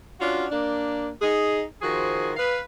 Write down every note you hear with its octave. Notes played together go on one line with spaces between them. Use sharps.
C#4 D4 F4 F#4
A#3 D4
D#4 G#4
D#3 F3 F#4 G#4 C5
B4 F5